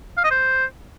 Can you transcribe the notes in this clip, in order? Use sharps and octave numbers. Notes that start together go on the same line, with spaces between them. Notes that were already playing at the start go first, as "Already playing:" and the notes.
F5
D#5
C5